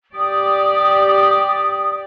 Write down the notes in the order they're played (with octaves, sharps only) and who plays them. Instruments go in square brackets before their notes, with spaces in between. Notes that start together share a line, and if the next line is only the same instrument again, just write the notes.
[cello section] G4 D5 [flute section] D#6